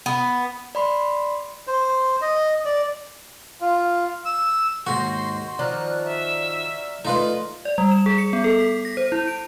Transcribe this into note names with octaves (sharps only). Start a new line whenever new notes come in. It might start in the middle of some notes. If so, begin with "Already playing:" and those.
B3
D5 B5 C6
C5
D#5
D5
F4
E6
D#2 G#2 D#3 F#4 C6 C#6 G6 A#6
C6
D#3 F3 D5 A#5 F6 F#6
E5
A3 D#4 F4 B4
D5
G3
E7
G#4
C#7
B3
A4
B6
A#6
C5
E4
D7